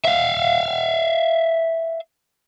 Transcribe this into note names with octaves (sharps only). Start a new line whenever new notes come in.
E5 F5